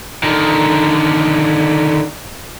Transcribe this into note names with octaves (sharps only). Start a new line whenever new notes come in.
D3 D#3